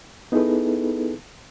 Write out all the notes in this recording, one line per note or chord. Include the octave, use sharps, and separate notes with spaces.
B3 D#4 E4 G#4 A4 B4